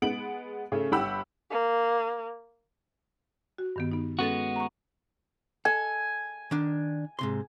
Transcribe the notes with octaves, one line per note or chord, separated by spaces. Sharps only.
G#3 B3 D7 F#7
C#3 A3
G1 G4 F#5 B5 E6
A#3
F#4
G2 D#3 B3
B3 D#4
G#3 B3 C#4 F#4 A4 A6
A#5 C#6
A4 G#5
D#3 D4
G#2 C3 C6